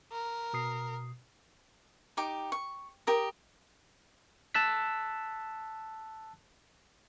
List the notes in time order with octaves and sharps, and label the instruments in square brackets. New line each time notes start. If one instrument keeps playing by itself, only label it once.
[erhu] A#4
[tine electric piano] B2 D#6 C7
[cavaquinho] D#4 G4 D6
C#6
G4 A#4 D#6
[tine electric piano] A5 E6 F#6 B6